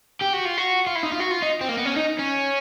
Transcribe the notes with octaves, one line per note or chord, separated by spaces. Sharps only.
G4
F#4
F4
F#4
F4
E4
D#4
F4
F#4
F4
D#4
C4
A#3
B3
C#4
D#4
C#4